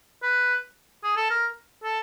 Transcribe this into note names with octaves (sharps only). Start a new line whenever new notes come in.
B4
G#4
A4
A#4
A4